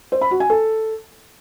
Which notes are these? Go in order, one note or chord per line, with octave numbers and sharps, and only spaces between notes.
C5
B5
F#4
G#5
A4